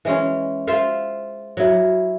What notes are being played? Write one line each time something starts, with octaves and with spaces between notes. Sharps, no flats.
E3 G#3 C#4
F4 C5 E5 F5
F#3 E4